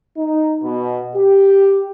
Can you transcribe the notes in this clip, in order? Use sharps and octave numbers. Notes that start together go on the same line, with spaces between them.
D#4
B2
G4